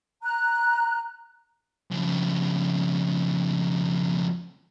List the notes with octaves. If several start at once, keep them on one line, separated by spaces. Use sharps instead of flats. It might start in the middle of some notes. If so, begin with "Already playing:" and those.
A#5 F#6
F2 C#3